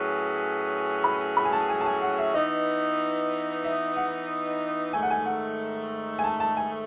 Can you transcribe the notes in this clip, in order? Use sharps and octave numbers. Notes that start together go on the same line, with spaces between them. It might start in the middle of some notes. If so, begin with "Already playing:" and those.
Already playing: A2 F#3 C#4 G#4 B4
B5
B5
G#5
A5
G#5
A5
G#5
F#5
E5
E3 B3 D#4 D#5
E5
F#5
G#2 D#3 A3 G#5
F#5
G#5
F#5
G#5
A5
A5
G#5